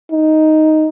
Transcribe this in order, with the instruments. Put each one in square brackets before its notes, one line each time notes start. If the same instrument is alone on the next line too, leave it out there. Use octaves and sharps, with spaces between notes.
[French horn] D#4